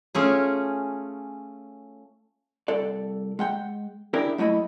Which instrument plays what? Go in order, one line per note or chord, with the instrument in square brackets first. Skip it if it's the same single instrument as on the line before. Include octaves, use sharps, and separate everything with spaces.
[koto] A3 C#4 F4 G#4
[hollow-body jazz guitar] C2 A4 D5
G#3 F#5 G5
D4 E4 G4 G#4 A#4
F#3 A3 E4 D#5 B5